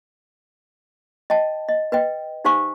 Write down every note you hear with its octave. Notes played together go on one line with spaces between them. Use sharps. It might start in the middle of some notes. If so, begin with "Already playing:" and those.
D#5 G5 A5
D#5
B4 D#5 G5
D#4 G4 C5 F5 G#5 C#6